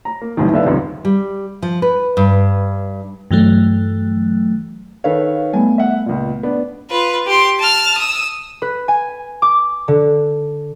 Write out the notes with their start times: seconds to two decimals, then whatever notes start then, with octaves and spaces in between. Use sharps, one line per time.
0.05 A#5
0.21 A#3
0.37 G1 C2 F#2 A2 D#3
0.53 D3 B3 B4 E5 F5
0.65 G#1 C#2 F#2 C3
1.05 G3
1.62 F3
1.82 B4
2.17 G2
3.31 G2 E3 F#3 A3
5.04 D#3 A4 B4 C#5 F5
5.54 G3 A3 B3 G#5
5.78 E5 F#5
6.06 C#2 A#2
6.43 B3 D4
6.90 F4 B4
7.26 G4 C6
7.59 A5 F6
7.97 D#6 E6
8.62 B4
8.88 G#5
9.42 D6
9.88 D3